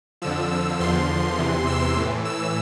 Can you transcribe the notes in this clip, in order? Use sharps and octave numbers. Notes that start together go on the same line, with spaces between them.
F2 D3 F3 E6
E6
E2 D3 F3 C6
E2 C3 E3
E6
A2 E3
E6